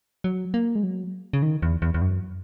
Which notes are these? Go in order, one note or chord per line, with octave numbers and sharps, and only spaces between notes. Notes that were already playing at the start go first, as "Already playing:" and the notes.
F#3
A#3
G#3
F#3
C#3
D#3
E2
E2
E2
F#2